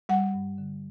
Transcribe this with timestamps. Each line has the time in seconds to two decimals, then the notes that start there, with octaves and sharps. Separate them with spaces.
0.09 G3 F#5
0.34 G2
0.58 D3